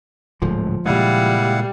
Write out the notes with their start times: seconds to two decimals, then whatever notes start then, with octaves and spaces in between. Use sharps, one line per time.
0.42 D1 G#2 D3 F3
0.86 A#2 C#3 G3 G#3 E4 F5 F#5